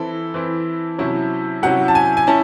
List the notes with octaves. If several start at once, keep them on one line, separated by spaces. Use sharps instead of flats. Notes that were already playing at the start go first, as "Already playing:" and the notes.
Already playing: E3 C4 E4 A4
E3 C4 E4
C3 F#3 C#4 E4
C3 F#3 C#4 E4 F#5
A5
G#5
G#5
C#4 E4 A5